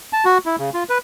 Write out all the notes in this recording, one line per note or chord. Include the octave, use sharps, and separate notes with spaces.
A5
F#4
E4
C#3
F4
B4